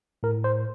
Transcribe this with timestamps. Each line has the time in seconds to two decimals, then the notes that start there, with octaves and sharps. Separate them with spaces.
0.23 A2 A#4
0.44 C5